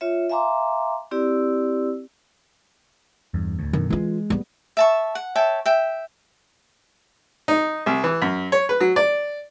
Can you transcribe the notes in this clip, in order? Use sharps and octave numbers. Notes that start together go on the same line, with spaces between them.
F4 C#5 E5
E5 F5 G#5 A#5 C6 D6
C4 E4 G4 D5 E6
E2 G2
D1 D2
F#2 B2 D3 D#3
E3 G#3 F4
G3 B3
E5 A5 C#6
F#5
C#5 E5 G5 A5
E5 G5
D#4
C2
E3
F#2
C#5
B4
F#3
D5